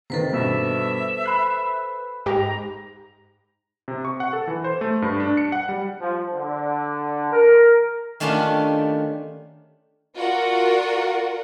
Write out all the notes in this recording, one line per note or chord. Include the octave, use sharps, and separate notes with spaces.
C3 D#3 A4 B4 C5
G2 B2 E5
B5 F#6 C7
G#2 G4 A#5
C3
C#6
F#5
A4
E3
C5
A3
G2
D4
C#7
F#5
G3
F3
D3
A#4
D#3 A3 C#4 D4 F4 G4
F4 F#4 A#4 D5 F#5